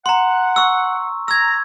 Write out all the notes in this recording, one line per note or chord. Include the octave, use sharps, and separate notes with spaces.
F#5 A#5 C6
C#6 E6
A#5 E6 G#6